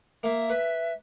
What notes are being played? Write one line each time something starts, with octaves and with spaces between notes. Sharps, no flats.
A#3 E5
B4